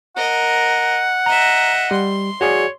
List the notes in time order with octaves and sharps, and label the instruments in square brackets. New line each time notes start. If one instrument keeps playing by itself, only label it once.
[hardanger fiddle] A#4 D#5 [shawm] F#5
[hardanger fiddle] D#5 E5 [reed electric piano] A#5
[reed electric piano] G3 [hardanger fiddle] C6
[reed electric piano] F#4 G#4 D5 [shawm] C#5